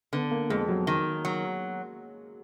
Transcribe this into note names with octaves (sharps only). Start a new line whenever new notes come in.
D3 B3
A#3
F2 G#3
F#3
D#3
F#3